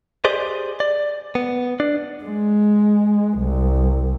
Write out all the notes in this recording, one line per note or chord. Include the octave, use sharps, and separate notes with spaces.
G4 G#4 C5 D5 D#5
D5
B3
D4 D5
G#3
C2